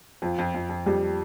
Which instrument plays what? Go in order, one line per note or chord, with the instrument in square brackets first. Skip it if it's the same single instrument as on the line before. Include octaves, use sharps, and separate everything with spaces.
[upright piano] F2 [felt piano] F3
[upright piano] F2
F2
F2
[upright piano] F2 [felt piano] G3